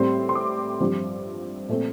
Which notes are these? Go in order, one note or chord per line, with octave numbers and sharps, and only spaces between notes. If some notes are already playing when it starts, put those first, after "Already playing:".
Already playing: A2 G3 C4 C6
C6
D6
G2 F3 C4
A#2 A3 C4